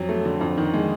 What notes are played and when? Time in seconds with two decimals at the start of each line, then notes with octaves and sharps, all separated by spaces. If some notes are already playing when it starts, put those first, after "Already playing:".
Already playing: F2 F#3
0.09 A3
0.25 D3
0.41 F2
0.58 D#3
0.74 G#3